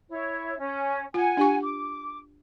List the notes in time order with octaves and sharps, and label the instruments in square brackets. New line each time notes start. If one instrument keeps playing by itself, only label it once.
[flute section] E4 C#5
C#4
[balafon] F4 [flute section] F#5 G#5
[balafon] D4 G4 C#6
[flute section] D6